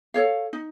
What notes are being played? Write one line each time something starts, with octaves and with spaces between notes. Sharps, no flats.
A4 C#5 F5
D#4